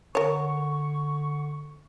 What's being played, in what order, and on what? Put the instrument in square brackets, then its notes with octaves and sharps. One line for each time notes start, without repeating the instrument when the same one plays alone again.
[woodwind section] D3 C#6 [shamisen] A#4 C#5